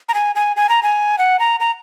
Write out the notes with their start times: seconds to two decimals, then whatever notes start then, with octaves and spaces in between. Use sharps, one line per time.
0.09 A#5
0.14 G#5
0.35 G#5
0.56 G#5
0.69 A#5
0.83 G#5
1.18 F#5
1.39 A#5
1.60 A#5